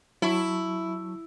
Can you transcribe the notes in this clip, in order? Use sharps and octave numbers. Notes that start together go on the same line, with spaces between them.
F#3 E4 A5 C#6